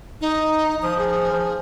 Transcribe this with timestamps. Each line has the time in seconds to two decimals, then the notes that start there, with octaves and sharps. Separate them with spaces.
0.21 D#4
0.82 F3 D#6
0.99 G#4
1.32 F3